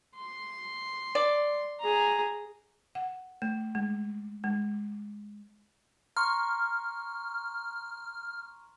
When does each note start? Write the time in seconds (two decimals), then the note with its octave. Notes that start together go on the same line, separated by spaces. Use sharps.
0.16 C6
1.15 D5
1.80 G#4 A#5
2.95 F#5
3.42 A3
3.75 G#3
4.44 G#3
6.17 A#5 C6 C#6 F6